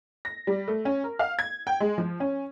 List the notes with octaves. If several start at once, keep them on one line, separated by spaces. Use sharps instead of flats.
A#6
G3
A3
C#4
A#4
F5
G#6
G5
G#3
F3
C#4